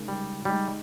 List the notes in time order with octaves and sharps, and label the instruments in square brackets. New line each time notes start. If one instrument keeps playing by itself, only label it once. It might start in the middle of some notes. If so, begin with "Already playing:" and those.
Already playing: [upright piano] C#3 G#3 D#4 A#4
[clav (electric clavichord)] G3
[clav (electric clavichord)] G3 [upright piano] G#3 D#4 G4